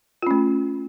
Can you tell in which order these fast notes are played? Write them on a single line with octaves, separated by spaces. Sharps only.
F4 C#4 A3